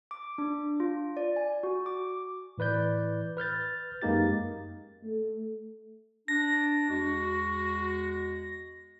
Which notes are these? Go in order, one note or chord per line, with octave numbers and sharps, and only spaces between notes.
D6
D4
F4
D5
G#5
F#4
D6
A2 E3 B4 D5 G6
B4 F6 G6 A6
F#2 G#3 A#3 D#4 G4 A6
A3
D4 A#6
E2 G#3 F#4